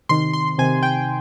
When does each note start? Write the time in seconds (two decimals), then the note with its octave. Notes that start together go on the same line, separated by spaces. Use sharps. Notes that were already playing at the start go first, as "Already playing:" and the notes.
0.09 C3 D#3 C6
0.33 C6
0.58 C3 D#3 G#5
0.83 G5